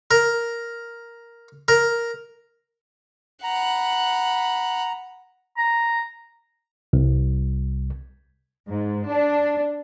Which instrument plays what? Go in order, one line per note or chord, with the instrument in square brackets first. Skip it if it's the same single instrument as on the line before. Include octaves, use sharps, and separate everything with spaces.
[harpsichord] A#4
A#4
[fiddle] F#5 B5 [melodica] A#5
[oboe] A#5
[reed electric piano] C2
[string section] G#2
D4